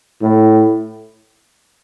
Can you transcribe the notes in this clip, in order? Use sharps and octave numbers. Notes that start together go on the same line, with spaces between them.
A2